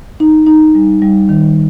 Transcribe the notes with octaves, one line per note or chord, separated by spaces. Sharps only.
D#4
D#4
G3
G3
D#3